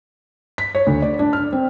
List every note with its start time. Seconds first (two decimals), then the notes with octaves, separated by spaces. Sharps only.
0.58 B6
0.75 C#5
0.87 D2
1.02 D5
1.19 D4
1.33 F6
1.53 C4